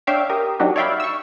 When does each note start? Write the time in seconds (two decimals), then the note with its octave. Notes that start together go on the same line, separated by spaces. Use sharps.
0.07 D4 C#5 E5 F5 G5
0.29 G4 A#4 D#6
0.60 F#3 D4 D#4 F#4 G4
0.76 C#5 D5 E5 F5 G5 B5
1.00 C#6 E6